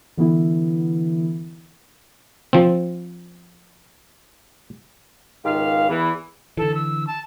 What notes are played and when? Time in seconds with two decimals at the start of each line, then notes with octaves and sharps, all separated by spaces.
0.17 D3 E3 B3 E4
2.53 F3 C4
5.45 C#2 G#2 D#3 G4 F5
5.89 E2 E3
6.57 D3 E3 A4
6.74 E6
7.07 A5